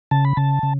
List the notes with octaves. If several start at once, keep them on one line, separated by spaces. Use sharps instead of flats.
C#3 A5
B5
C#3 A5
C#3